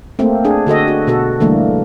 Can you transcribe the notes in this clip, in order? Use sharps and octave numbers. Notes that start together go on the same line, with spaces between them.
A3 A#3 C4
D4 G#4
D3 F#4 A4 D#5
F#4
B2 F#4 A4
D3 E3 G3 A3 A#3